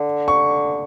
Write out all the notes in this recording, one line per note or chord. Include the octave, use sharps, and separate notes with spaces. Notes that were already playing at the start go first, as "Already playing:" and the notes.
Already playing: D3
C#6